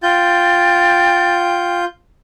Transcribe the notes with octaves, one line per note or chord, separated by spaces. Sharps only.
F4 G5 G6 A6